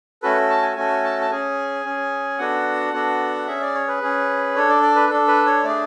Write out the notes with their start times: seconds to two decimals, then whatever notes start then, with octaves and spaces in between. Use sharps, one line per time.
0.23 A3 C#4 F#4 A4 B4
0.50 A5
0.62 G#5
0.76 A3 C#4 F#4 A4 G#5
1.04 A5
1.21 A5
1.31 C#4 G#4 G#5
1.85 C#4 G#4
2.38 B3 D4 F#4 A4 F#5
2.93 B3 D4 F#4 A4
3.47 C#4 G#4 E5
3.61 D5
3.74 C#5
3.88 B4
4.02 C#4 G#4
4.56 D4 A4 C#5
4.69 D5
4.83 D5
4.96 B4
5.10 D4 A4
5.28 B4
5.46 C#5
5.64 A3 D4 G#4 D5